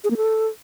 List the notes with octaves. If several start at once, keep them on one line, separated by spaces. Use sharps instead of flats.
G#4
A#3
A4